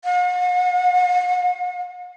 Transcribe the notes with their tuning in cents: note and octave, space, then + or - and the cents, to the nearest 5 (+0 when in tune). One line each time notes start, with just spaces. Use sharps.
F#5 -45